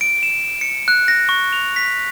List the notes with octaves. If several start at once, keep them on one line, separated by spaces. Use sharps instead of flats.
D7
E7
C#7
F#6
A#6
C#6
F7
B6